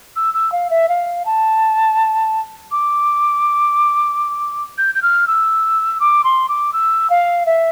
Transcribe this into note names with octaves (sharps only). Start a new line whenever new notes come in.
E6
E6
F5
E5
F5
A5
D6
G6
G6
F6
E6
D6
C6
D6
E6
F5
E5